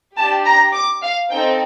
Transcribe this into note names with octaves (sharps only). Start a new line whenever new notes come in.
D4 G4 A5
A#5
D6
F5
C4 D#4 A4 G5